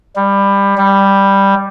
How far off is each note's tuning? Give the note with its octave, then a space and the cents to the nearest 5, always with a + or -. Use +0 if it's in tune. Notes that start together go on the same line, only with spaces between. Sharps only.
G3 +20
G3 +5